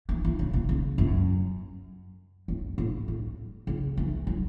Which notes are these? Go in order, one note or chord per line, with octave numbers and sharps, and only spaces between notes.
E3
E3
C#3
B2
C#3
F#2
F#2
A2
A2
C#3
E3
F#3